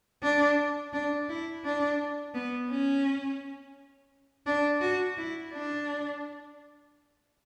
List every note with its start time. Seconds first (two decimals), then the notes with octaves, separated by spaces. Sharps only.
0.23 D4
0.93 D4
1.29 E4
1.64 D4
2.34 B3
2.70 C#4
4.46 D4
4.81 F#4
5.17 E4
5.53 D4